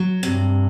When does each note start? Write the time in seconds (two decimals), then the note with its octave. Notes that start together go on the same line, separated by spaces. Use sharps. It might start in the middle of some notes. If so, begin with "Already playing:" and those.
Already playing: F#3
0.23 G2 C3